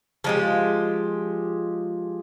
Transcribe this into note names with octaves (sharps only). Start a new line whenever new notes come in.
F3 G#3 G4